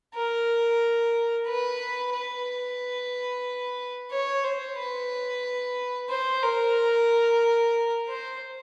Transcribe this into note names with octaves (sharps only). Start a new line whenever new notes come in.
A#4
B4
B4
C#5
C5
B4
C5
A#4
C5